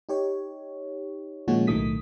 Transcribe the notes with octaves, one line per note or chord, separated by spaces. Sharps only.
D#4 G4 C#5
A#2 D#3 F3 G#3 C#4 F#4
B1 A2 D#3 A3 D#6 B6